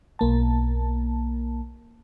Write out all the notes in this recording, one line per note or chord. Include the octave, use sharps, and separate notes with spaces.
B1 A#3 A5